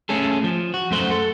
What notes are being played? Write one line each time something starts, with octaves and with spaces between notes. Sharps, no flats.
A3 C#4 G#4 A4
F3
F#4
F#2 A3 C5 F#5
A4